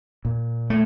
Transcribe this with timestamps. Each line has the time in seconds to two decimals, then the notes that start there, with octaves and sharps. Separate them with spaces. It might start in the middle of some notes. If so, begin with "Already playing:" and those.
0.25 A#2
0.70 A3